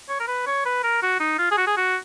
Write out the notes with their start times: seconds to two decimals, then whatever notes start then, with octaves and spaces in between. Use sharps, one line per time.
0.09 C#5
0.20 A#4
0.27 B4
0.47 C#5
0.65 B4
0.83 A#4
1.02 F#4
1.20 D#4
1.38 F4
1.51 G#4
1.57 F#4
1.67 G#4
1.76 F#4